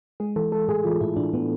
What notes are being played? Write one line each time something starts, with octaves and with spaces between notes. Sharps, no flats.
G#3 G#4
E3 A4
G#3 A4
A2 G#4
E3 F4
A2 E4
A2 D4
A2 B3